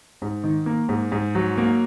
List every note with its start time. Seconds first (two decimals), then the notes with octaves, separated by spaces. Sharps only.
0.22 G#2
0.44 D#3
0.66 A#3
0.89 G#2
1.12 G#2
1.35 F#3
1.57 A#3